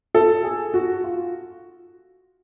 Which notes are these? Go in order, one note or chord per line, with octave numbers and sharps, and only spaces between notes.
A4
G#4
F#4
F4